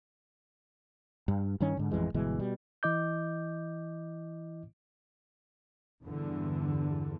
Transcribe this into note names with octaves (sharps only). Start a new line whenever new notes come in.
G2
G2 D#3 C#4
G#2 D3
A1 F2 E3 G#3
G1 B2 E3 G#3
B2 G3
E3 E4 D#5 D6 G6
E2 G2 D3